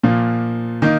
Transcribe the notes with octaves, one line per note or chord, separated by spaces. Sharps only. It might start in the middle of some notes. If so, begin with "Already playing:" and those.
A#2 F3 A#3
D#3 A#3 D#4